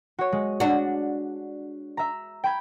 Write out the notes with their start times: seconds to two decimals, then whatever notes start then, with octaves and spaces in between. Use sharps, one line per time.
0.19 F#4 C#5
0.33 G#3
0.60 D4 F#4
1.97 E5 A#5
2.44 G5 B5 G#6